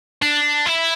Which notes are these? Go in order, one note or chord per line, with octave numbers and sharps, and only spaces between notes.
D4
E4